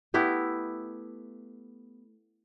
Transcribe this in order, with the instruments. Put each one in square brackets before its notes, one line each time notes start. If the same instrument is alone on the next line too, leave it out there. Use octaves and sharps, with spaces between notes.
[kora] A3 B3 E4 G4